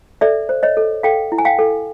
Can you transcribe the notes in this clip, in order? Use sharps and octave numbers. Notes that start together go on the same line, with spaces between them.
A4 D5 E5
C5
C#5 D#5
A4
A4 F5 G5
E4
G#5
F5 G5
A4